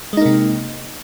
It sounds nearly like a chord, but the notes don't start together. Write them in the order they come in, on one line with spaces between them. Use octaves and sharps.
G#3 D#4 A#3 C3